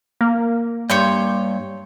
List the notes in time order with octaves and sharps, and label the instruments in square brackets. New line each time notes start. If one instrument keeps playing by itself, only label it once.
[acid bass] A#3
[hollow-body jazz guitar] G2 [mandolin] C#5 C6 G6